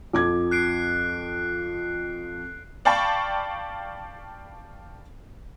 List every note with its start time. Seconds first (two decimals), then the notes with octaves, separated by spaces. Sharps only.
0.13 F2 D6 G#6
0.51 F#6 C7 D7
2.85 D5 F5 G5 A5 B5 C#6